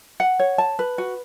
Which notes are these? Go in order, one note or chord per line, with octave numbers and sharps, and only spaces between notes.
F#5
C#5
A5
B4
F#4